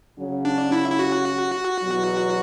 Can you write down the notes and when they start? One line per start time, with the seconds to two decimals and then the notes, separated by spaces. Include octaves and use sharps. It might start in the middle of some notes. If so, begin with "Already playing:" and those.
0.17 C#3 F#3 C#4
0.45 D4
0.72 E4
0.90 E4
0.99 F#4
1.82 E2 B2 F#3